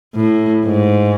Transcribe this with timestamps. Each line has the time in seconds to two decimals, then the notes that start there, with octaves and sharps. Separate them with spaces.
0.15 A2
0.64 G#2